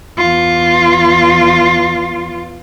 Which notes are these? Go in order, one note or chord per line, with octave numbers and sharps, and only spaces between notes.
E2 F4